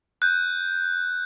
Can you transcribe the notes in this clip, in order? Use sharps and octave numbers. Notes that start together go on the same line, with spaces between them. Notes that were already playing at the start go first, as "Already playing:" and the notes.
F#6 G6